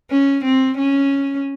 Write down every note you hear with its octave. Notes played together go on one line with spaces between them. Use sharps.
C#4
C4
C#4